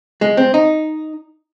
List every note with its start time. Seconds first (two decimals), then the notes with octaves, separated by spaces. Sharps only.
0.21 G#3
0.37 C4
0.54 D#4